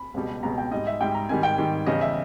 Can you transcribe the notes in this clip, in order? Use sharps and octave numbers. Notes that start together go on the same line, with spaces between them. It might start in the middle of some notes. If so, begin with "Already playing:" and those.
Already playing: B5
C#2 B2 G3
C#2 B2 G3 A#5
G5
G#2 G3 D#5
E5
G#2 G3 G5
A#5
G#2 D#3 G3 G#5
G5
G#2 D#3 G3
E2 C#3 G3 D#5
E5